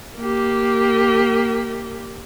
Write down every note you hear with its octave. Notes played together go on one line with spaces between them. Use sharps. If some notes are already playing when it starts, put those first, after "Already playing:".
A#3 G4